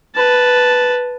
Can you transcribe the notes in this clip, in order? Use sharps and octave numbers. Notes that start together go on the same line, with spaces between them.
B4 A5